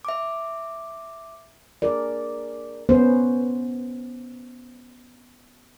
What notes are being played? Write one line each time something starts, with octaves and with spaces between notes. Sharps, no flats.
E5 D6
G#4 A#4 D5
B3 C#4 C5